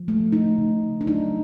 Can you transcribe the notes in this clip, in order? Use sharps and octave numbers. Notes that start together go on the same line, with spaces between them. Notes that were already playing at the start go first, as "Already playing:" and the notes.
Already playing: F3
A3
A3 D#4
C#3
C#3
D4
F#3 D#4